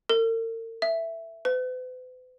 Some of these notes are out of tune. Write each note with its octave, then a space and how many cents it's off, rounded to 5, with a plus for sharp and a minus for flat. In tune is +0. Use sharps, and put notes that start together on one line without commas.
A#4 -45
E5 +5
B4 +45